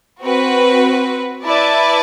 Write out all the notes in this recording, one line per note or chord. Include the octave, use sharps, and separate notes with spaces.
C4 F#4 B4
E4 B4 D5 A5